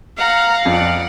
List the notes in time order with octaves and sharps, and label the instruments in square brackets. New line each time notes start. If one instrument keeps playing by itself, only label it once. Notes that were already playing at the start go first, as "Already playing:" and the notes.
[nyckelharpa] F5 [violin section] F#5 A#5
[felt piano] F2 [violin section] D5 F#5